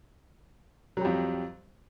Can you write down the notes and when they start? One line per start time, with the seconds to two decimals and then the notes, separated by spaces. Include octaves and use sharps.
0.97 F#3
1.01 G3
1.05 F2